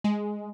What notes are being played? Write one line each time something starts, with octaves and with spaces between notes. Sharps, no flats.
G#3